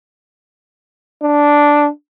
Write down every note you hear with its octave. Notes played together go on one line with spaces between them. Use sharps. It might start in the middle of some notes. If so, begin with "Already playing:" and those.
D4